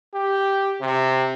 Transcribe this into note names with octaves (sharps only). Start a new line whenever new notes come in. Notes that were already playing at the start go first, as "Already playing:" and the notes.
G4
C3